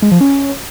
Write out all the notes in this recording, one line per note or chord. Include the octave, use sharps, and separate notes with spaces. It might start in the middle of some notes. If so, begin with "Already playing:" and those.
G#3
F3
C#4